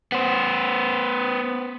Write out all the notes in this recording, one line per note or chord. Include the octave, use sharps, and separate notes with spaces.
B3 C5